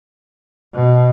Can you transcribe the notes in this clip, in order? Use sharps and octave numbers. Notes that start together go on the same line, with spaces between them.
B2